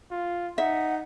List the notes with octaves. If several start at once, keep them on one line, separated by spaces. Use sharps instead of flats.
F4
D#4 E5 F#5